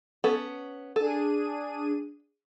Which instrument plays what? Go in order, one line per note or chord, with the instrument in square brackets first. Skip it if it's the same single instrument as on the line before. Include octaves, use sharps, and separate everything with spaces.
[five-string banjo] B3 C#4 A4
[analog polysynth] D4 G#4 D#7 [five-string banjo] A4